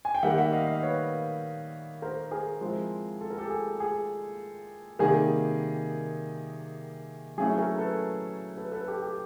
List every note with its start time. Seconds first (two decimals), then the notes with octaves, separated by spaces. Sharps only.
0.05 G#5
0.15 G5
0.23 D#3 G3 A#3 E5 F#5
0.37 E5 F#5
0.53 D#5 F5
0.67 D#5 F5
0.82 B4 C#5
2.02 A#4 C5
2.31 G#4 A#4
2.61 F3 G#3 C4 E4
3.21 A4
3.30 A#4
3.38 G4 A4
3.50 G#4
3.80 G#4
4.99 C3 D#3 G3 A#3 G#4
7.38 F#3 A3 C#4 E4 G#4
7.58 G#4 A#4
7.77 A4 B4
8.57 A4 B4
8.72 A4 B4
8.88 G4 A4
9.02 G4